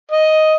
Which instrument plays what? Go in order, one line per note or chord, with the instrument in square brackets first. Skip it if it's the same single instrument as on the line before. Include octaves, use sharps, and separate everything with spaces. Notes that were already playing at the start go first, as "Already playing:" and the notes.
[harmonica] D#5